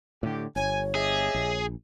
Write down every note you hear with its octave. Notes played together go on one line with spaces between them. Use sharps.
A2 D3 G4
G1 C#5 G#5
G4 G#4 D#5 E5
A#1